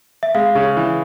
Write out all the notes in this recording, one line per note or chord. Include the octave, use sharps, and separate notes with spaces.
E5
G#3 F5
C#3
E3